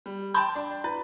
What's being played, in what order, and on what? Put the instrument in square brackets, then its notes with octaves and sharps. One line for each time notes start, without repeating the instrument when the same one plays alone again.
[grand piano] G3
[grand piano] G5 A5 G6 [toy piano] B5 C6 D#6
[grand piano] D4
[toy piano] E4 [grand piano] B4